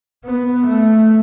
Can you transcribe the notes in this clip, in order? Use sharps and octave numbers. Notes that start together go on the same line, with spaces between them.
B3
A3